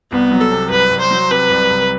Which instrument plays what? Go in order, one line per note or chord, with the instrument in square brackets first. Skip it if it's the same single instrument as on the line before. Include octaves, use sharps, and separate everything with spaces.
[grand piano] C2 [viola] B3
[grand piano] F#3
[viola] A4
[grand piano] C3
[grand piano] C2 [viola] B4
[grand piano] C2
[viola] C5
[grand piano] F#3
[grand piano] C3 [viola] B4
[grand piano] C2
C2